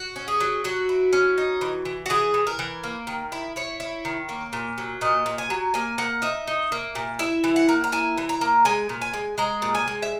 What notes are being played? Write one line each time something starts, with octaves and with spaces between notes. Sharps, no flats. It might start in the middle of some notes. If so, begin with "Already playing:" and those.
Already playing: F#4
C#4
G#4
F#3
F#3 F#4
E4
C#4
D#4
E3
E3
F#4
E3 G#4
E3
A#4
E3
A#3
D#3
E4
E4 C#5
E4
D#3
A#3
A#2
F#3
A#2 D#5
A#2
G#5
F#3
A#3 G#5
A#3 F#5
D#4 E5
D#4
A#3
A#2
E4 E5
E3
F#5
A#3
A#5
E4 G#5
E3
A#5
A#3
G#3 G#5
A#2
G#5
G#3
G#3 A#5
A#2
G#5
G#3
E5